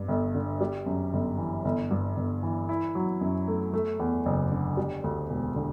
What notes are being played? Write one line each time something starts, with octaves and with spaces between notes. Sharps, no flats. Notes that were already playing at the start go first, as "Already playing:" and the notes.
Already playing: G2
G1
D3
G3
F#2
G1
E3
G1
G2
G1
E3
E4
F#3
F#2
A3
A3
E2
F#1
D3
G3
D2
E1
D3